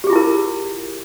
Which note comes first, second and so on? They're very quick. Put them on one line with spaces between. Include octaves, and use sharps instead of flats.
G4 G#4 F4 E4 A#4